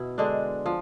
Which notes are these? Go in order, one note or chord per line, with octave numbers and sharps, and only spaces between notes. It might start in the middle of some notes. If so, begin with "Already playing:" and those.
Already playing: B2 E4
D3 G#3 D4
F3